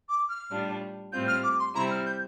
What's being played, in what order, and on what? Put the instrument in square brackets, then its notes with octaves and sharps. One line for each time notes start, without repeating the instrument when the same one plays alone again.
[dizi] D6
F6
[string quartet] A2 G3 D4 F4
[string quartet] A2 G3 C4 F4 [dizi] G6
[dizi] F6
D6
C6
[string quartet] C3 G3 C4 E4 [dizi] A#5
[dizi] F6
G6